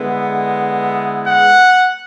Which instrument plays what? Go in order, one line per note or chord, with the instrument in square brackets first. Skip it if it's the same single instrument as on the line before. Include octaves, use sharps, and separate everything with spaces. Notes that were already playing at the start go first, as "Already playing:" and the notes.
Already playing: [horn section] D3 G#3 B3 E4
[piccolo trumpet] F#5